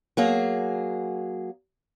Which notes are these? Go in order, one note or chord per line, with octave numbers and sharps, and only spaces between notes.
F#3 A#3 G#4